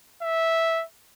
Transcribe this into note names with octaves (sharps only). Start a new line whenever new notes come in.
E5